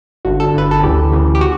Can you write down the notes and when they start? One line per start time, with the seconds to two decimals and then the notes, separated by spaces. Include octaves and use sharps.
0.25 G1 G2 D3 F#4
0.40 A4
0.54 G1 G2 D3 B4
0.71 A4
0.83 D2 C#3 E3 G4
1.12 D2 C#3 E3
1.35 G4
1.41 F#4